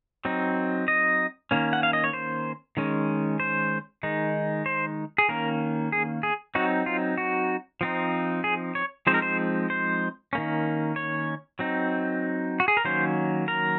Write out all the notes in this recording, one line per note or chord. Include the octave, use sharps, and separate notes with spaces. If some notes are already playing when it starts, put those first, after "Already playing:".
F#3 C4 D#4
D#5
D#3 A#3 C#4
F#5
F5
D#5
C#5
C5
D#3 G#3 C#4
C5
D#3 G#3 D#4
C5
G#4
D#3 A#3 C#4 A#4
G#4
G#4
F#3 C4 D#4 F#4
F4
F#4
F3 C4 D#4
G#4
C#5
F3 G#3 C4 D#4 C5
A#4
C5
C5
D#3 A#3 C#4
C#5
F#3 C4 D#4
F#4
G#4
A#4
D#3 F#3 A#3 C#4 C5
A#4